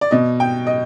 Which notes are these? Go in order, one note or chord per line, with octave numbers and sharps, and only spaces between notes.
D5
B2 D#5
G5
D#5